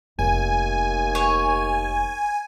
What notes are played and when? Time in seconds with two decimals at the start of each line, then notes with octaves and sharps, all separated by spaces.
0.19 F1 D#2 G#5
1.15 C#5